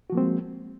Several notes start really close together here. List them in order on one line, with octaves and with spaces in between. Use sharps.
F#4 F3 A#3 C4 G#3